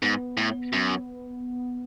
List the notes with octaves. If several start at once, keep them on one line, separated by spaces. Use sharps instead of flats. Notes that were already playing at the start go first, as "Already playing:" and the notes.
G#2 B3
A2
F#2